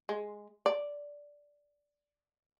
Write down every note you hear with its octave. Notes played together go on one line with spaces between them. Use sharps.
G#3
D5